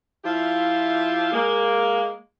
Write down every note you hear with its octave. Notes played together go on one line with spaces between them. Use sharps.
F3 E4 F4 G4 E5 F5
G#3 A#3